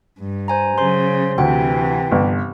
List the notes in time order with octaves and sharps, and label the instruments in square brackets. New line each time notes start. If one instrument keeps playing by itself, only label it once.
[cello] G2
[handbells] C5 G#5 A#5
[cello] C#3 F#3 [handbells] C5 C6
[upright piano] D2 [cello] C3 E3 [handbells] G5
[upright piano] G1